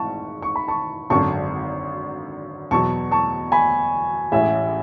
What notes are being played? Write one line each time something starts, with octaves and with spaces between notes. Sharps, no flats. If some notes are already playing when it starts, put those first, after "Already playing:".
Already playing: G#1 G#2 E3 A5 C#6
C#6
B5
A5 C#6
G#1 F#2 D3 A5 C#6
E2 B2 F#3 A5 C#6
A5 C#6
G#5 B5
A1 A2 G#3 C#4 E5 G#5